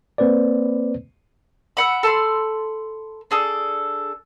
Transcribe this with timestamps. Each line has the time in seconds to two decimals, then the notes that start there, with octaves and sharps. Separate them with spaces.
0.18 A#3 C4 B4 C5 D5
1.77 E5 F#5 B5
2.03 A4 A5 B5 C6
3.31 D4 G#4 A4